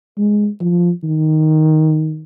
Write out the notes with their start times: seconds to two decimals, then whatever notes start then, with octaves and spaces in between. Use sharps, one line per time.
0.18 G#3
0.61 F3
1.04 D#3